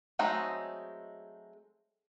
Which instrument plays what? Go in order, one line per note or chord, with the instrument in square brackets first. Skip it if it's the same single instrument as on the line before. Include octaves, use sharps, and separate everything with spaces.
[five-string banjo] F#3 G#3 A3 C4 D#4